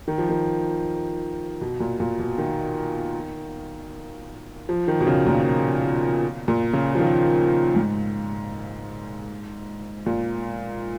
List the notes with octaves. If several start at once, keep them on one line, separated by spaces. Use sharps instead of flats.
D#3
F3
D#3
B2
A#2
A#2
B2
D#3
F3
D#3
B2
C#3
A#2
A#2
C#3
F3
D#3
G#2
A#2